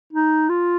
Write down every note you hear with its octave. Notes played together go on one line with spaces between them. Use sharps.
D#4
F4